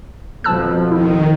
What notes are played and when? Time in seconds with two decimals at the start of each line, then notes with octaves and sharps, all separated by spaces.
0.44 F2 B2 F3 A5 E6 F#6
0.92 D#3 E4